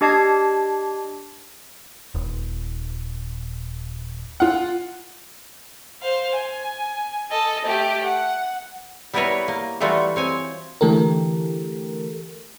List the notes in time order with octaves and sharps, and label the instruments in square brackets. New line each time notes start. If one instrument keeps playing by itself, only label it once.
[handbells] D4 G4 D#5 A5 G#6 C7
[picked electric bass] D#1
[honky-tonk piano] F4 F#5
[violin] C5 F5
G#5
A4 D#5
A3 G4
F#5
[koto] G3 B3 E4 A#4 B4 C#5
A#3
E3 G3 A3 F4 F#4
C4 C#5 G#5
[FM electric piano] D3 E3 A3 G4 A4 A#4